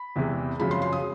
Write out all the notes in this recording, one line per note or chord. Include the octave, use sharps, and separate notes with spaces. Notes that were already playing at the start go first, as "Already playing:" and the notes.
Already playing: B5
E2 C3 E3 G#3
F#2 C#3 F3 G#3 B5
C6
C6
D#6